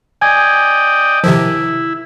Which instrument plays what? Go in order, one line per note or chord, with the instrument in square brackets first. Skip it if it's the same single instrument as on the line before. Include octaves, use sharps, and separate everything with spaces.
[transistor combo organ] D5 D#5 G5 [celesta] G#5 G#6
[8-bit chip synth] C3 D#3 F3 [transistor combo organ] E4